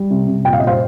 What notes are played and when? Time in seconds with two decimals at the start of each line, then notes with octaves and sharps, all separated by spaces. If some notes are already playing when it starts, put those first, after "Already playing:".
Already playing: G3
0.10 C3
0.28 C3
0.45 A#2 G5
0.53 F5
0.60 D#5
0.62 A#2
0.67 C5 F5